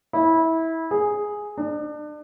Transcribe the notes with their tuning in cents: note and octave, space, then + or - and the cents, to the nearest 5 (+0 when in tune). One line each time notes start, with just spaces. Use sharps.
E4 -20
G#4 +0
D4 +35